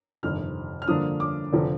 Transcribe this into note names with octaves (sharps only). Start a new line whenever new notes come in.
G1 F2 C3 D#3 F6
F6
G2 D3 F3 A#3 D4 D#6
D6
F1 D3 F3